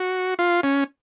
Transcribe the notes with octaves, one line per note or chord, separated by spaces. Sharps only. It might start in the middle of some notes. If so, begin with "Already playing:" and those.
Already playing: F#4
F4
C#4